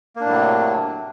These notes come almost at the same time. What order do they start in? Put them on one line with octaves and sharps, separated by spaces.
A#3 D4 A2 F#3 C3